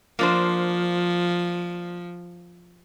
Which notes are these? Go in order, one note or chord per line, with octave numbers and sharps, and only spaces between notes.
F3 A#3 D4 C5